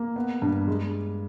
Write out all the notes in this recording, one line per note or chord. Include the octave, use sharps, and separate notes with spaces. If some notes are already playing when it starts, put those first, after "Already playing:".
Already playing: A#3
B3
G2
G#3